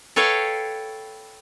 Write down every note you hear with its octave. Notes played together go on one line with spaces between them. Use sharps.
A4 B4 C#5 F5 G5